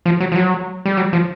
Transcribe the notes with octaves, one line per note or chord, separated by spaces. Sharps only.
F3
F#3
F3
F#3
G3
F#3
F3